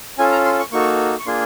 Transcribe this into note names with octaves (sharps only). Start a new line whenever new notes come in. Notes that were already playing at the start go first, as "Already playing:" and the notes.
C#4 F4 A4 G#5
A#5
C6
C#6
A#3 D#4 F#4 A4 C#6
C#6
A#3 D4 F4 G#4 C6